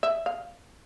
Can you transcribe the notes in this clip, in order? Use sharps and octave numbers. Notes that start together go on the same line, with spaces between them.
E5
F5